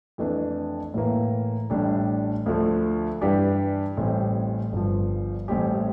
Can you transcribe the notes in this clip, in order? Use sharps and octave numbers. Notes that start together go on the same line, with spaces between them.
F2 E3 A3 D4
A2 E3 A#3
A1 A2 G3 D4
D2 D3 F3 A3
G2 E3 G3 D4 G4
A1 A2 G3 C4
G1 G2 F3
A1 A2 G3 C4 G4